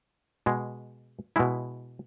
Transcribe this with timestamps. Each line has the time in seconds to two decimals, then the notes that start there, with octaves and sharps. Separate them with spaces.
0.46 B2 G#3
1.36 B2 G#3 E4